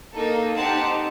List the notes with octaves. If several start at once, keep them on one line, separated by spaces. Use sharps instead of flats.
A#3 D#4 A4
C4 D#4 G4 F#5 A5